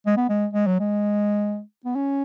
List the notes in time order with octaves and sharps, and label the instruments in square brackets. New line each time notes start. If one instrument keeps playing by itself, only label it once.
[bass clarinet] G#3
B3
G#3
G#3
F#3
G#3
B3
C#4